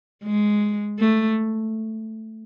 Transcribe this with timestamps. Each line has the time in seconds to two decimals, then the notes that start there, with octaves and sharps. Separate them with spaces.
0.24 G#3
0.99 A3